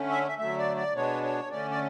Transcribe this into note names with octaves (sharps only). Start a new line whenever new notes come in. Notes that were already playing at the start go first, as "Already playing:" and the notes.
Already playing: D3 A3 C#4
E5
E5
D3 F#3 A3 E5
D5
D5
B2 G#3 B3 D4 C#5
C#5
D3 A3 C#4 D5
D5